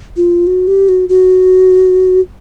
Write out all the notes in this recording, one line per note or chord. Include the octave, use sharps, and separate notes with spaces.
F4
F#4
G4
F#4
F#4